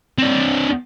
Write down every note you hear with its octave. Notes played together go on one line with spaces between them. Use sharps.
C4 D4